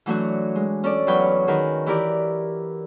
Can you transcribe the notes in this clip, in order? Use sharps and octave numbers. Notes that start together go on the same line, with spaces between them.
E3 F#3 A3 D4 F#4
G#3
C#4 A4 D5
E2 E3 F#3 B4 G5 C#6
D#3 F#4 G#4 A#4 B4
E3 E4 G4 A#4 D5